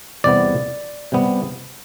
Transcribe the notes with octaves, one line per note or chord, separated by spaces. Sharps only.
E2 C3 G3 B3 D5
C3 G3 B3